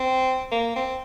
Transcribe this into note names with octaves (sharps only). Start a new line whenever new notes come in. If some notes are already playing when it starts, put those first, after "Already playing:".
Already playing: C4
A#3
C4